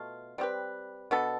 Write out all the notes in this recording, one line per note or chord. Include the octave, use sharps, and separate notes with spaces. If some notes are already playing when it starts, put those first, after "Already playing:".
Already playing: B2 A3 F4
G3 C4 G4 B4
B2 B3 D4 A4